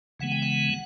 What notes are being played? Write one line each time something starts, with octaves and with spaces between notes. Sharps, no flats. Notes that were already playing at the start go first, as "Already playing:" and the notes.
C#3 E3 G#3 B3 F#5
G5
F#5